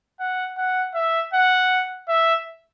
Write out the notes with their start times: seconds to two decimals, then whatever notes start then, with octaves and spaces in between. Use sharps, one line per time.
0.20 F#5
0.57 F#5
0.95 E5
1.33 F#5
2.08 E5